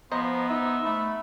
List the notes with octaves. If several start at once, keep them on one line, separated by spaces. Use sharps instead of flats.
F3 B3 C5 D#5 A#5
D#4 E5
A3 B5